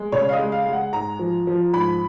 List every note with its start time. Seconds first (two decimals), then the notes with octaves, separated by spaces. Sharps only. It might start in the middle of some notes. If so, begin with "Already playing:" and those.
Already playing: G#3
0.12 C#3 C#5
0.29 F5
0.33 D#5
0.39 G#3
0.52 F5
0.65 G#3
0.73 F#5
0.93 G#2 A#5
1.19 F3
1.47 F3
1.73 G#2 B5